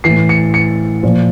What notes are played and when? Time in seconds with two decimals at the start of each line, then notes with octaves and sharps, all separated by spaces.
0.04 A2 E3 C7
0.29 C#7
0.54 C#7
1.03 A#2 F3